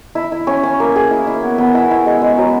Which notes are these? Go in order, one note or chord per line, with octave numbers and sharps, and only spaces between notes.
E4
E4
C#4
C#4
A#3
G#4
E4
E4
B3
B3
E4
E4
G#3
G#3
F#3